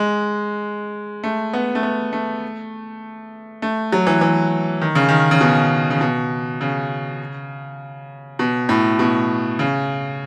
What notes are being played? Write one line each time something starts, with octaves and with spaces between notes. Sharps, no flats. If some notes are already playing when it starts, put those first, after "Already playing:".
Already playing: G#3
A3
B3
A3
B3
A3
A3
F#3
E3
E3
D#3
C#3
D#3
C#3
B2
C#3
B2
C#3
B2
A2
B2
C#3